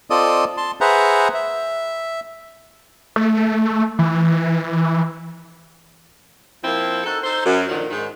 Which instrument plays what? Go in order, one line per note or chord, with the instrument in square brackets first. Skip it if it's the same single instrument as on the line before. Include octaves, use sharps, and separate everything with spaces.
[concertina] C4 F4 A4 D5 D#5 D#6
A5 C6
G#4 B4 C5 E5 F#5 A#5
E5
[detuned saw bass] A3
E3
[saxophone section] F3 A#3 C4 E4
D#4 F#4 A4
D#4 A4 C5
F#2
F#2 A#2 D3 D#3 F3
G#2 D#3